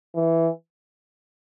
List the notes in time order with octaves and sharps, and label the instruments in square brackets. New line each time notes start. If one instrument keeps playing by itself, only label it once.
[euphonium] E3